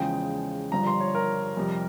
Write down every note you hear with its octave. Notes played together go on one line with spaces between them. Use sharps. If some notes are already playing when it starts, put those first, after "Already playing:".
Already playing: E2 C#3 F3 G#3 G5
G1 G2 F3 A#5
C6
C#5
A#4
F2 C3 G3